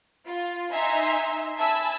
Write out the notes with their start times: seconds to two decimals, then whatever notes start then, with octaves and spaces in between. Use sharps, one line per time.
0.25 F4
0.71 D#4 E5 G#5 A#5 C6
1.57 E5 G#5 A5 B5 E6